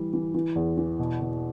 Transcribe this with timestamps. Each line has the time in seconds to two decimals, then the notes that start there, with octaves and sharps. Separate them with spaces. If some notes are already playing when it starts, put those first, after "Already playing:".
Already playing: E3 G3
0.13 E3
0.34 E3
0.55 E2
0.77 E3
0.99 B2
1.21 B2